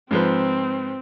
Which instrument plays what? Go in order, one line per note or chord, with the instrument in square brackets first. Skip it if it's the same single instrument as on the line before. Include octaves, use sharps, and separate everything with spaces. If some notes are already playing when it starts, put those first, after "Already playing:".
[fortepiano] G#2 F3 B4 [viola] C4